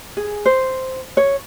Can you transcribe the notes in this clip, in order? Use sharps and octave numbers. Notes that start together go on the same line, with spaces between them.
G#4
C5
C#5